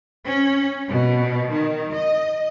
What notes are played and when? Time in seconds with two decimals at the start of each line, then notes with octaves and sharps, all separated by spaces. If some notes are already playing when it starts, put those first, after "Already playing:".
0.24 C#4
0.88 B2
1.51 D#3
1.93 D#5